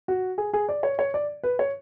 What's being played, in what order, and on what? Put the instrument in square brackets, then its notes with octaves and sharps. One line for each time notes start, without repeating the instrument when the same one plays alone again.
[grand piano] F#4
G#4
G#4
D5
C#5
C#5
D5
B4
C#5